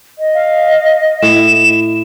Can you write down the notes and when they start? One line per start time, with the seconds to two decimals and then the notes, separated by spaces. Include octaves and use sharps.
0.19 D#5
0.34 F5
1.22 A2 E7